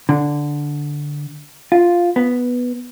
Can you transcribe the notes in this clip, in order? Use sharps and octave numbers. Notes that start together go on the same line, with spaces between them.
D3
F4
B3